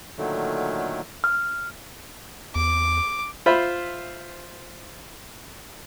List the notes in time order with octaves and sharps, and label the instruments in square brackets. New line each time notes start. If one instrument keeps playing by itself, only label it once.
[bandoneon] A#2 D3 D#3 F#3 A3
[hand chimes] F6
[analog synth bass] E2 [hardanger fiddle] D6
[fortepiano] F4 C5 E5 B5